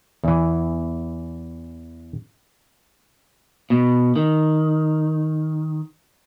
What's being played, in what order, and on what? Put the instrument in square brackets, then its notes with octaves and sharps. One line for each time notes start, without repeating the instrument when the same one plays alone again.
[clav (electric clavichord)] E2 E3
[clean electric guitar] B2
D#3